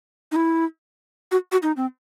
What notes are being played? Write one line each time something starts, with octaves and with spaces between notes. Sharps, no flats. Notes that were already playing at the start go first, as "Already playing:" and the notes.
D#4
E4
F#4
F#4
D#4
C4